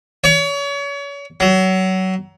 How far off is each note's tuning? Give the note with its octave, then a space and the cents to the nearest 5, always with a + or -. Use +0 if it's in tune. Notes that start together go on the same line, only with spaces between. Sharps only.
C#5 +35
F#3 +25